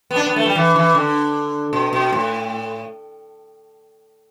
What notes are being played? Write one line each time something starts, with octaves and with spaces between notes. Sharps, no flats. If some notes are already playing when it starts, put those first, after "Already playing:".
B3
D4
B3
A3
G3
E3
E3
D3
B2
B2
A2